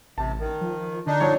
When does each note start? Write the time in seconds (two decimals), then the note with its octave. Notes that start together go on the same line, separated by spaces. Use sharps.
0.18 A1 C3 A5
0.40 D#3
0.61 F3
1.07 D3 D4 D#4
1.20 A#1 C#5